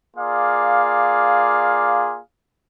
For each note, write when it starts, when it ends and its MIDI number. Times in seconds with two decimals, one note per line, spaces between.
0.17 2.19 58
0.17 2.19 65
0.17 2.19 68
0.17 2.19 74
0.17 2.19 77